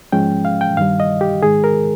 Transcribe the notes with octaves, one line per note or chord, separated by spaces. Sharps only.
G#2 F3 G#3 C#4 G5
F5
G5
G2 D#3 G3 F5
D#5
G4
G#2 D#3 G#3 G#4
A#4